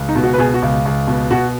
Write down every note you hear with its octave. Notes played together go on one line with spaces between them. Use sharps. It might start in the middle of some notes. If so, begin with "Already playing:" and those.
Already playing: C#2
D#4
B2
F#4
B4
B2 G#4
F#4
C#2
C#2
B2
B2 F#4